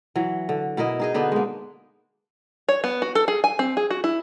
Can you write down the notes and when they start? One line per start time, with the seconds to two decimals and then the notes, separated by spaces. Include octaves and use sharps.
0.16 E3 F#3
0.49 D3
0.77 B2 E4 A#4 D#5
0.99 D#4 G#4 D#5
1.14 D3 B3 D4 D#4
1.32 G#3 A#3
2.69 C#5
2.84 B3
3.02 F#4
3.15 A4
3.28 G#4
3.44 G#5
3.59 C4
3.77 G#4
3.90 F#4
4.04 E4